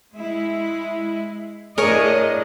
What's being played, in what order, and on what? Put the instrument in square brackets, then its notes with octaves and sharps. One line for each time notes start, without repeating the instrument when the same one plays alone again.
[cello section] G#3 E4
[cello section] A2 D4 D#5 [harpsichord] G#4 [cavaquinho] A#4 [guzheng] C#5